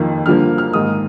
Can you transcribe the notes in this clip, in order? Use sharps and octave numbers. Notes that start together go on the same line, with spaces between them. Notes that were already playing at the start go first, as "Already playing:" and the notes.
Already playing: F2 D#3 A#3
G2 D3 F3 A#3 F6
F6
G#2 D#3 A#3 D#6